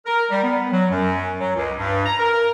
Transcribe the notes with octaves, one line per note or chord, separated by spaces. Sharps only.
A#4
G3
B3
F#3
F#2
F#3
C#2
G2
A#5
A#4